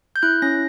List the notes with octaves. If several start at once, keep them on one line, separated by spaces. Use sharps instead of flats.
G6
E4 F#6
C#4 A#6